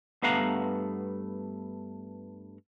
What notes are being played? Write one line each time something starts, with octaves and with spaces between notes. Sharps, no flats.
G2 A3 B3 F5 F#5 A#5